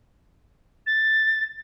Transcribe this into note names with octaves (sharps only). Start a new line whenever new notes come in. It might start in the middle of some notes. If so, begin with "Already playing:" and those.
A6